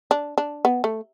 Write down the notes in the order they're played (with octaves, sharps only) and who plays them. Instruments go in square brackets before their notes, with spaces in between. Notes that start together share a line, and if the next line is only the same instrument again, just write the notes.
[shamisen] D4
D4
B3
A3